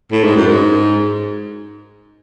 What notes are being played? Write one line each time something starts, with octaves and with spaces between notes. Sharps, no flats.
A2
G#2
F#2
G#2